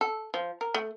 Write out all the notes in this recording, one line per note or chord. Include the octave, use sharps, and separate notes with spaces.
A4
F3
A#4
A3